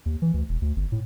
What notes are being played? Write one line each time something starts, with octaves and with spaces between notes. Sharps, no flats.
D#2
E3
D2
E1
D2
G1
A2